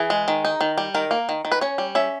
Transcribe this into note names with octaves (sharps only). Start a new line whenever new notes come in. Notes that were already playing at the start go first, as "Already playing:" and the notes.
Already playing: E3 G#4
G#3
D#3
D#4
D#3
G3
D#3 A#4
A#3
D#3
D#3
B4
C#4 C#5
G3
C#4 E5